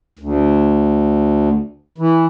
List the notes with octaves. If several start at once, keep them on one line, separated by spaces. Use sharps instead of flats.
D2
E3